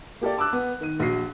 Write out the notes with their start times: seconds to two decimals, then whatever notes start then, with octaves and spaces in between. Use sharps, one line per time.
0.21 A#3 G4 A4 D5
0.38 A5 D6 E6 F#6
0.53 B3
0.81 D#3 D#7
1.00 A#1 F#4 C7